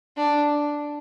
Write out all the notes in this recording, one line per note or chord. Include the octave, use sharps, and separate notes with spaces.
D4